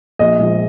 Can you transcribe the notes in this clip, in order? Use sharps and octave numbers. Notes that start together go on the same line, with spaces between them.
A#1 D#5
A#2 F3 G#3